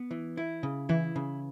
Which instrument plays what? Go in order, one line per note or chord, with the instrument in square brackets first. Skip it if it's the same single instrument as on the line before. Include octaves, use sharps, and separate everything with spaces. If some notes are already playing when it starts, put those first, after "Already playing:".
Already playing: [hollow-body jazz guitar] B3
E3
E4
C#3
[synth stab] E3 [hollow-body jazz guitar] E4
[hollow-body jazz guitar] C#3